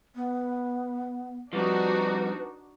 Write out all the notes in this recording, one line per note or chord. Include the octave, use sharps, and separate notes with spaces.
B3
F3 G3 C4 D4 D#4 F#4 B4